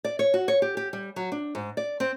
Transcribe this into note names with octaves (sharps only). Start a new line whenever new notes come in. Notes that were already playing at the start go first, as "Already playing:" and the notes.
D5
C#5
F#4
C#5
G4
G4
G3
F#3
D4
G#2
D5
C4